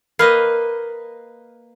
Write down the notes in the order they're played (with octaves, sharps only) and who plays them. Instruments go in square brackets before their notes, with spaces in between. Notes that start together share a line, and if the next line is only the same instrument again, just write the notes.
[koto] A#3 B4 D#5 [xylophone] B5 F6 C7